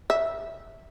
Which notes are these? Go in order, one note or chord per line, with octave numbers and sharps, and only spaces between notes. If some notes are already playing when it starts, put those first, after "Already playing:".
E5